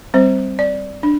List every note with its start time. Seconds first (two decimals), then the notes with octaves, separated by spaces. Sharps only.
0.14 G3 C4 C5
0.59 D5
1.03 D4